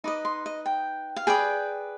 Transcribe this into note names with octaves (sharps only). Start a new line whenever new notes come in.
D#4 B4 D#5 D6
C6
D#5
G5
F5
G#4 B4 D5 G5